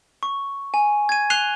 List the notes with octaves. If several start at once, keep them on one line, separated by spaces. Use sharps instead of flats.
C#6
G#5
G#6 D#7
F#6 C7 D#7 F7 G7